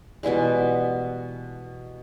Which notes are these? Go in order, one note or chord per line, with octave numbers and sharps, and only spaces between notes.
B2 E3 G3 G#3